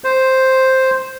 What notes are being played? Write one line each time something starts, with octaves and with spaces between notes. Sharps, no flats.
C5